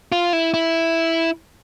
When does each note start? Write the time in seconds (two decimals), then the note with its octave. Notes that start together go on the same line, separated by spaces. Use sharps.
0.12 F4
0.33 E4
0.54 E4